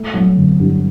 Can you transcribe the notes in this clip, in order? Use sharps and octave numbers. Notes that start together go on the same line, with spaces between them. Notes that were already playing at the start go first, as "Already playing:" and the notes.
Already playing: A3
F#3
G1
G2